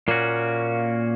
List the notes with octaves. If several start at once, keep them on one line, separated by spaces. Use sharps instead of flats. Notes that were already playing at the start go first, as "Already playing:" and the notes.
A#2 A#3 C#4 F#4